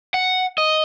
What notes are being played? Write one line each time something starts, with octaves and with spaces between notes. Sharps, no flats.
F#5
D#5